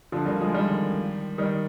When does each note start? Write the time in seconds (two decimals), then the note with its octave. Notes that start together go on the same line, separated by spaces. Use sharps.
0.12 D3 F3
0.26 G3 A#3
0.40 F3 G#3
0.54 D#3 G3
1.38 D#3 G3